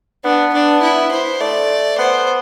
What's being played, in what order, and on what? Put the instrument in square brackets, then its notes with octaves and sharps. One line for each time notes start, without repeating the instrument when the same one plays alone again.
[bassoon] B3 [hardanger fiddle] D4
[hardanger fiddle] D4
E4
C5
[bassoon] A3 [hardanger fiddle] D5
[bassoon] B3 [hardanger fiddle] C5